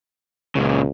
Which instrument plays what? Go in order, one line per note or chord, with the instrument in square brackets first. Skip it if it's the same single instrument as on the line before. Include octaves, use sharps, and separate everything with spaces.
[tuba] C#2 [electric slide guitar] A#2 C#3